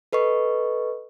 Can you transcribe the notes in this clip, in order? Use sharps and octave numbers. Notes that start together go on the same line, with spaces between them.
A4 B4 D#5 C#6